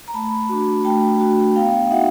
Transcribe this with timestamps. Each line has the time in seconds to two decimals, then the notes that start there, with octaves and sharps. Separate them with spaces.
0.08 A#5
0.14 A3 A5 B5
0.49 D4 F#4
0.85 A3 G5 A5
1.20 D4 F#4
1.55 B3 F5 G5
1.90 D#4 F#4 E5 F#5